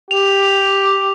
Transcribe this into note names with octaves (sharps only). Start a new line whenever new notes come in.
G4 F7